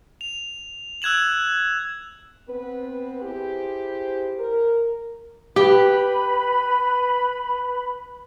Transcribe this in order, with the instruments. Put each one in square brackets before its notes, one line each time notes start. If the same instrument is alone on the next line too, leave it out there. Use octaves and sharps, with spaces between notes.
[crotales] F7
E6 F#6 G#6 E7 F#7
[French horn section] B3 C4 B4
E4 G4 G#4 C5
A#4
[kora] G4 [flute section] B4 B5